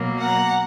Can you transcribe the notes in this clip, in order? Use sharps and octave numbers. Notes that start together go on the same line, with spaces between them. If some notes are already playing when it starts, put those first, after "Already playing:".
Already playing: B2 F#3 A#3
F#5 A#5